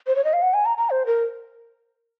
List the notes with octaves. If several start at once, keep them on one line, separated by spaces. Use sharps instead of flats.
C5
C#5
D#5
F5
F#5
G#5
A#5
A#5
C5
A#4